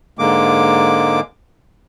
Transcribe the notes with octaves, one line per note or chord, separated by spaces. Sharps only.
G#2 D3 G#3 A#3 D6